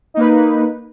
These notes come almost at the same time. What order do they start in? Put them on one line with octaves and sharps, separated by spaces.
D#4 A#3 B4